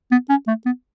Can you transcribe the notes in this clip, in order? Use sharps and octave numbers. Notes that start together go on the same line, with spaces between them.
B3
C#4
A3
B3